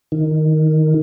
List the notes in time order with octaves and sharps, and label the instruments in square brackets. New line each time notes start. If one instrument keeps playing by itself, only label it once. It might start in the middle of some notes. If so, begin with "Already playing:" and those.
[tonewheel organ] D#3